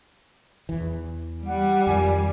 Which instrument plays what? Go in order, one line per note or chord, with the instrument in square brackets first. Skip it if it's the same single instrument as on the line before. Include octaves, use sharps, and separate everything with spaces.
[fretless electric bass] E2 E3
[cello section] G3 [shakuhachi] F#5
[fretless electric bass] F2 D#3 F3 [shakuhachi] G#5